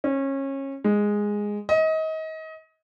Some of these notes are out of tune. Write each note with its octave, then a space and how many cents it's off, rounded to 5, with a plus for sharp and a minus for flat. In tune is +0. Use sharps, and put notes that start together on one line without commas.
C#4 -25
G#3 -5
D#5 +30